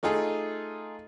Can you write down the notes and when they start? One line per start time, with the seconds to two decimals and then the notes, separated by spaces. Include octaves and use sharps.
0.03 A3 D#4 F4 G#4 A4